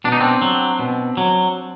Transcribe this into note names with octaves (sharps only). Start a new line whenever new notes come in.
B2 D4
D#4
C4 D4
F#3
B2
F#3